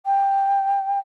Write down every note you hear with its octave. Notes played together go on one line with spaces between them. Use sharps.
G5